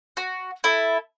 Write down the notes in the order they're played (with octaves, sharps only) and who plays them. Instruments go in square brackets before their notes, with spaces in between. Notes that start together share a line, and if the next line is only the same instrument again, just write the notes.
[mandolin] F#4
E4 A4